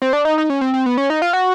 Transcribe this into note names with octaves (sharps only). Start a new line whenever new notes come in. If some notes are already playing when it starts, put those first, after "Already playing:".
C4
D4
D#4
D#4
C#4
C4
C4
B3
C#4
D#4
F4
F#4